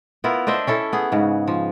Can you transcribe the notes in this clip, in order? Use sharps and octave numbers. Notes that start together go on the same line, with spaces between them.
B3 E4 F4 A#4
D4 C5 D#5 E5
C#4 E4 A4
B3 G#4
G#2 C#3
F3